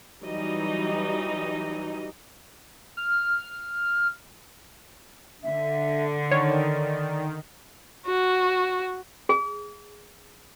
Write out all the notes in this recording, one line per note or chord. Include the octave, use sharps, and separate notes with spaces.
E3 F#3 G3 D#4 D#5
F6
D3 E5
D#3 C#5 D5
F#4
G#4